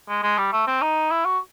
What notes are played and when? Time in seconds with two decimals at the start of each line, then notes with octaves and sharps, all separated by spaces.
0.09 G#3
0.23 G#3
0.38 G3
0.52 A3
0.67 C4
0.82 D#4
1.11 E4
1.25 F#4